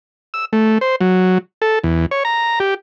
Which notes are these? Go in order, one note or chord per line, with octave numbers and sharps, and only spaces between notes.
E6
A3
C5
F#3
A4
E2
C#5
A#5
G4